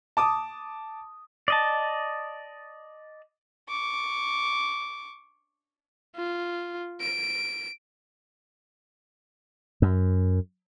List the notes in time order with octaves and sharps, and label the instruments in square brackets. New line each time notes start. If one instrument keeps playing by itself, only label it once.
[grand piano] A5 D6 D#6
[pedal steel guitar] D5 D#5 A5
[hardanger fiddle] C#6 D6
[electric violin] F4
D7
[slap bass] F#2